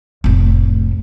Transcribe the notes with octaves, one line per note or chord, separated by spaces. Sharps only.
F1 A2